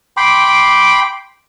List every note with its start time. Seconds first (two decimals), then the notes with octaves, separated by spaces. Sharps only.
0.17 G5 B5 C6 D6